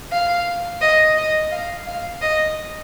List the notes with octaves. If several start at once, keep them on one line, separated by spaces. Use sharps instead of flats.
F5
D#5
D#5
F5
F5
D#5